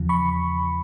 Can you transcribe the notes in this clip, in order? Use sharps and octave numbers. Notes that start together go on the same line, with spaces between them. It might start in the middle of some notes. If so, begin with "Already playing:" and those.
Already playing: E2 C#3 F3
B5 C#6